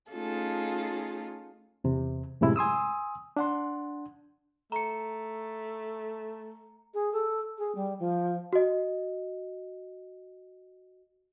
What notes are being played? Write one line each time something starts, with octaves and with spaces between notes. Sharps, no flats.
A3 C#4 D#4 F4 G#4 A4
E2 C3
F#2 A2 C3 G#3 E4
G#5 C6 D#6 E6
D4 F#5 C6
A3 A#5 C#7
G#4
A4
G#4
G3
F3
F#4 D#5